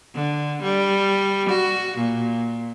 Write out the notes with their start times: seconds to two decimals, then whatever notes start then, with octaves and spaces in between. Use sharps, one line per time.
0.14 D3
0.62 G3
1.49 F#4
1.97 A#2